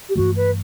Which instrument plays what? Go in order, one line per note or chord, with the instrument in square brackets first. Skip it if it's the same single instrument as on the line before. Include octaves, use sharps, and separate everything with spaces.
[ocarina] G4
[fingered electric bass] G2 E3 A3 [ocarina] F#4
[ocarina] B4